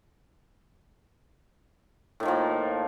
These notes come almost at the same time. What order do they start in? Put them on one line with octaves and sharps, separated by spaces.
A2 D#3 F3 A#3